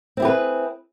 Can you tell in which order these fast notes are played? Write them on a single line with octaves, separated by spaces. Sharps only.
C4 E4 G4 B4 G#4